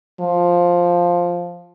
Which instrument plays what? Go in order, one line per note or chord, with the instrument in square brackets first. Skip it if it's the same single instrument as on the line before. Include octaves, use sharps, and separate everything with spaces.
[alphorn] F3